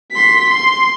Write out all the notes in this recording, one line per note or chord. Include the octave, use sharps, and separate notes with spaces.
C6 B6
C6